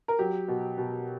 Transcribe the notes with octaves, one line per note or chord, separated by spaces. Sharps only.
A#4
F#3 G4
B2
B2